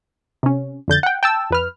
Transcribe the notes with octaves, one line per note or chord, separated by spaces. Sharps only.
C3 C#4
F2 D3 G6 A6
F#5 G5
G5 A5 E6
F2 B4 F6